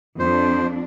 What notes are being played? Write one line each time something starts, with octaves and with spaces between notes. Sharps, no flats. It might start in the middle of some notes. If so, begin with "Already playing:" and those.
F2 D4 C5